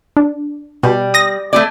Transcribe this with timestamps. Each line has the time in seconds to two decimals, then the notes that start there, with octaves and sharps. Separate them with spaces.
0.17 D4
0.83 B2 G3
1.14 D#6 A#6
1.53 A3 G#4 D5